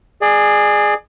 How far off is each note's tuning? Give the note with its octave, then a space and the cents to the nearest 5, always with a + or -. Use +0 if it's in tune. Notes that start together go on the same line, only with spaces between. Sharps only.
G#4 +0 D5 +30